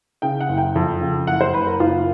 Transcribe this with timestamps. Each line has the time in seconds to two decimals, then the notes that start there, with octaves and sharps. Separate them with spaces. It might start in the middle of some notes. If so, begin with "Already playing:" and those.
0.22 C#3 G5
0.40 F#5
0.49 F#1
0.58 G5
0.76 F2
1.01 C#3
1.27 F#1 F#5
1.41 C5
1.54 F#1 B4
1.67 A#4
1.80 F#1 F4